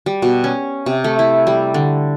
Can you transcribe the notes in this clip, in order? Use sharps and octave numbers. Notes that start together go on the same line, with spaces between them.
G3
B2
C#4
C3
A3
E4
G3
D3